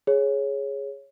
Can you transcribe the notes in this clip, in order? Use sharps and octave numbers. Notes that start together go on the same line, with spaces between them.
G#4 C#5